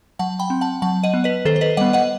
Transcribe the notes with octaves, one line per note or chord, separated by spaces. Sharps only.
F#3 F#5 A5
G5 B5
C4
F#5 A5
F#3 F#5 A5
D#5 F#5
B3
B4 D#5
D#3 A4 C5
C5
B4 D#5
G3 B3 D#5 F#5
D#5 F#5